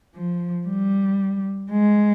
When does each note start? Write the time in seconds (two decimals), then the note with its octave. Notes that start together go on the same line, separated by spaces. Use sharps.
0.15 F3
0.67 G3
1.71 G#3